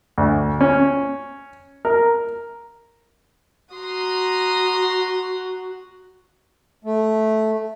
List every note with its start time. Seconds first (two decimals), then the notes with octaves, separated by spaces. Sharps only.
0.18 D2
0.61 C#4
1.85 A#4
3.74 F#4 A#5 C6 D#6
6.84 A3